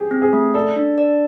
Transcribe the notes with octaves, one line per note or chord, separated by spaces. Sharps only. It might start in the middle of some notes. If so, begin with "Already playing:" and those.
Already playing: G4 G#4
C4
G#4
A3
A4 D5
D4
D5